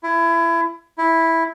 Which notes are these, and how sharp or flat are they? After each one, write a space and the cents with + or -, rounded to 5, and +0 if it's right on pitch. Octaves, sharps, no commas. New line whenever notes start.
E4 +25
E4 -5